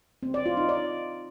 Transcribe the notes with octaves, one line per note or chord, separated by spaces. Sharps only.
C4
D5
F4
D#4
D5